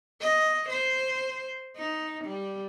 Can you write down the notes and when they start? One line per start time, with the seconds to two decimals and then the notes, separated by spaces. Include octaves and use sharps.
0.21 D#5
0.70 C5
1.76 D#4
2.25 G3